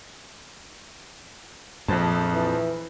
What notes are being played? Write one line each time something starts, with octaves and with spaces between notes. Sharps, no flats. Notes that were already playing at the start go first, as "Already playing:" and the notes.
A#1 F2 C5 A5
E3